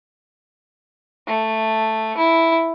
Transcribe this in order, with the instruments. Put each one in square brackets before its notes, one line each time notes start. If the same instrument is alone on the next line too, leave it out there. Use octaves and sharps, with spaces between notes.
[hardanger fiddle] A3
E4